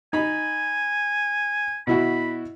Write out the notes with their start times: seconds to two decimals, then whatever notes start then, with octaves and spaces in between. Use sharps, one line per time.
0.13 D#4 G#5 B5
1.87 B2 E4 F#4 B5